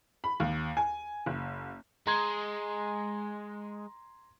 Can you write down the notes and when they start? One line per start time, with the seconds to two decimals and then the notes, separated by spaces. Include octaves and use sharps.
0.24 B5
0.40 D#2
0.77 G#5
1.26 F#1
2.07 G#3 A#5 C6 G#6